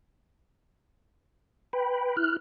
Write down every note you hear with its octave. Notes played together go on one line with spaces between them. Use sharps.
B4 G5 B5
E4 F6 F#6